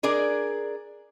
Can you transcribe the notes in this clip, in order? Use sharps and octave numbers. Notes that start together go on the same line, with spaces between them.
D4 G#4 A#4 D5